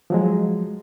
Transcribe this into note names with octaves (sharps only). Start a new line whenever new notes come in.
F3 F#3 G#3